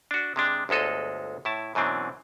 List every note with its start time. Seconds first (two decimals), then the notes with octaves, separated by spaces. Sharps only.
0.11 D4 F#4
0.36 C3 G#3 D4
0.69 G1 D2 G#3 A4 D#5
1.45 A2 E4 A5
1.75 F#2 B2 E3 C4 D4